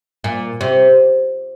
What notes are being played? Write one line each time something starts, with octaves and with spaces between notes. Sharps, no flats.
A#2
C3